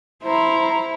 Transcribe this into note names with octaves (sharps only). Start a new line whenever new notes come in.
E4 C5 A#5